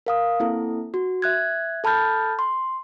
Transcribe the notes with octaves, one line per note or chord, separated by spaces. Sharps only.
A#4 F5 D#6
A#3 C4 E4 A4
F#4
E5 F#6 G#6
A4 A5 B5 F6 G6 A6
C6